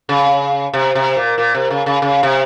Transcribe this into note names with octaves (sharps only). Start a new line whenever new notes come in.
C#3
C3
C3
A#2
A#2
C3
C#3
C#3
C#3
C3